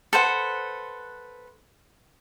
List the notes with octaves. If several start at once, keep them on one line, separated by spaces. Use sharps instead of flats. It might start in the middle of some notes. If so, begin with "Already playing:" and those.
A4 B4 C5 F#5